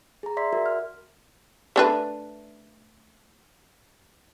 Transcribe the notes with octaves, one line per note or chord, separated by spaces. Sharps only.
G#4 A#5
D5 E5 C6 B6
F#4 A#4 E5
F6
A3 D4 B4